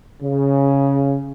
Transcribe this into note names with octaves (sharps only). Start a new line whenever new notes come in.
C#3